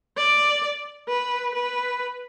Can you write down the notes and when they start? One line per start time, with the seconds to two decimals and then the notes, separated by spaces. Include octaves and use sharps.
0.17 D5
1.08 B4
1.55 B4